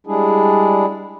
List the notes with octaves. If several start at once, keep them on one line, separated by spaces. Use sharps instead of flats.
G3 G#3 D4 E4 G#4